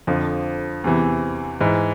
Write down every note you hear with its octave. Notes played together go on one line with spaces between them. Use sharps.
F2 D3 F3
E2 C3 E3
G#2 E3